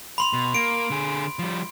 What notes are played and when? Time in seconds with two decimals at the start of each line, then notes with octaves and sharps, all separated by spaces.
0.18 B5 C6 F7
0.33 B2
0.54 A#3 D7
0.90 D3 G#4
1.39 F3 G3